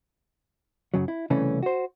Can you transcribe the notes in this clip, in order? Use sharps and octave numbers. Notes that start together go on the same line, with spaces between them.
F#2 C#3 F#3
E4
C2 C#3 E3 A3 C#4
F#4 C5